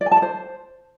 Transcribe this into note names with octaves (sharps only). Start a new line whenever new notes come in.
D5
G#5
A5
D5
C5